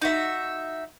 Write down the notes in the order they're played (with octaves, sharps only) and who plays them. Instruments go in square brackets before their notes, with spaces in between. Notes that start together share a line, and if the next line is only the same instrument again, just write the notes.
[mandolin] D#4 F#4 E5